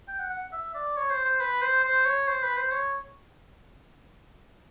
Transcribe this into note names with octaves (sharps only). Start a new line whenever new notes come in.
G5
F#5
F#5
E5
D5
C#5
C5
C5
B4
C5
C5
C#5
C5
B4
C5
C#5